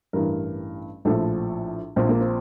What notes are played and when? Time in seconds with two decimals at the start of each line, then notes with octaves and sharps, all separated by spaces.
0.13 A1 G2 E3 A#4
1.05 A#1 A2 F3 A4
1.96 A#1 A#2 F3 C4
2.09 A#3
2.21 C4